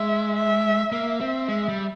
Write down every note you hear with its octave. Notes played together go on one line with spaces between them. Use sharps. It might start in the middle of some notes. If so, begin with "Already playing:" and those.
Already playing: G#3 E5
E5
A#3 E5
C4
G#3 E5
G3